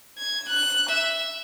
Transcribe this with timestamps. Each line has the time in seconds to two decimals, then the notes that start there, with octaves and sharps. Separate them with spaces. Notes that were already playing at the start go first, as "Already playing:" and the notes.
0.18 G#6
0.49 F#6
0.89 E5